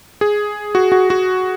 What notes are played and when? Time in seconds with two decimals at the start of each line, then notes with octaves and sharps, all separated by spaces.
0.21 G#4
0.75 F#4
0.92 F#4
1.10 F#4